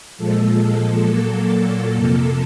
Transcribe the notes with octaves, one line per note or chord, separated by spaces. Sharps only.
A#2 F3 G#3 A4
A4
A#2 F#3 A#3
F2 C3 F3 A#3 A4